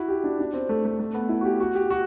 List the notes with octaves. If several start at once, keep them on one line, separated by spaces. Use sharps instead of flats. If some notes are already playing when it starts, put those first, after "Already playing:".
Already playing: E4 F#4
G4
D4
D4
C4
A3
A3
A3
B3
E4
F#4
G4
F#4
G4
F#4